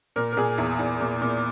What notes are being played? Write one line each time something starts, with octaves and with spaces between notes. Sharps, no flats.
A#2 A#4
A#4
A#2 G#4
E2
E2
A#2
A#2